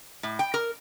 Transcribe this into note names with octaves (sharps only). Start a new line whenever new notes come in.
A2
G5
A#4